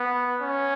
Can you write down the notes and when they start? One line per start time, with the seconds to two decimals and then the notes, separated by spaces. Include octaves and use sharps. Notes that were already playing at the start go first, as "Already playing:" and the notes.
Already playing: B3
0.41 C#4